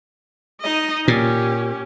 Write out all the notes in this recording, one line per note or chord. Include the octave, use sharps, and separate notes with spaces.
D#4 D#5
A#2 C#4 G4